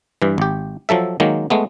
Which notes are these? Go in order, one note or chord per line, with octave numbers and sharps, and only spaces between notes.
G2 E3
G#1 G4
F3 F#3 A4 E5
D#3 F#3 G#3 A#3
G#3 A3 B3